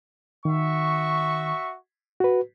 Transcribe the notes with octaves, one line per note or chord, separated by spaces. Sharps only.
D#3 F#4 E5 C#6
F#4 B4